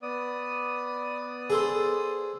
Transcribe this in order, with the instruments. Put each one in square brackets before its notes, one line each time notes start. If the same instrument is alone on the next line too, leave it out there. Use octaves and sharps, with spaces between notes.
[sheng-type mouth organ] B3 D5 D#6
[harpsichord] G#4 A4 C5